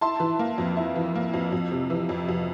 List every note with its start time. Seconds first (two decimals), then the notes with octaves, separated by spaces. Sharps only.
0.01 E4 A5 C6
0.20 E3
0.39 A#3
0.58 F2
0.77 E4
0.96 E3
1.15 A#3
1.34 F2
1.52 F2
1.72 C3
1.90 E3
2.09 F2
2.29 F2